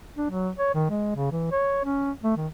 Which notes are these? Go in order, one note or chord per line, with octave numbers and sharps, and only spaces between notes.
D4
F#3
C#5
D#3
G#3
C#3
E3
C#5
C#4
A3
D#3